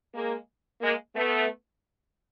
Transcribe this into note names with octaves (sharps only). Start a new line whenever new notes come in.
G#3 A#3
G#3 A#3
A3 B3